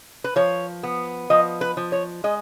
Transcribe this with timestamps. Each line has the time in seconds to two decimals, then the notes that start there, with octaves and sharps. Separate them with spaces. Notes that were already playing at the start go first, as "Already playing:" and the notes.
0.24 B4
0.36 F3 C#5
0.83 B3
1.30 F3 D#5
1.61 B4
1.77 F3
1.92 C#5
2.24 G#3 D#5